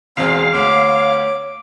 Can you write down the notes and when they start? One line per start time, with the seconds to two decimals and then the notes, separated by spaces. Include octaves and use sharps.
0.17 E1 E2 G#3 C4 F5
0.54 D2 C#5 D6